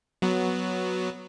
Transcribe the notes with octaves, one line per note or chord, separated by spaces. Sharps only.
F#3 B3